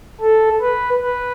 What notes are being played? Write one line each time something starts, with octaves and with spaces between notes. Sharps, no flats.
A4
B4
B4